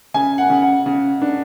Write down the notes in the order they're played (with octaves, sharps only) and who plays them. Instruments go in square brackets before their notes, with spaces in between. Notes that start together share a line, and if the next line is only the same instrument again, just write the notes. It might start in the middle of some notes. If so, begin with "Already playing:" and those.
[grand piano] C#3 G#5
F#5
C#3
F#5
C#3
D4